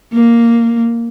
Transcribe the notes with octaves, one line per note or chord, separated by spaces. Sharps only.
A#3